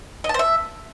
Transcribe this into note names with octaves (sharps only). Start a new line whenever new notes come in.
D#5
A5
C5
E5